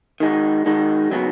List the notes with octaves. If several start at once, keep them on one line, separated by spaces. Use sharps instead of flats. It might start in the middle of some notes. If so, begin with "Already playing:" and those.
D#3 G#3 D#4 F#4
D#3 G#3 D#4 F#4
C#3 F#3 B3 D#4 F#4